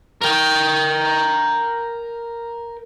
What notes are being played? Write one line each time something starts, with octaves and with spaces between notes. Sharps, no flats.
A#4 G5